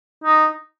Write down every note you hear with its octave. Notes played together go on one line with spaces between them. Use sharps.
D#4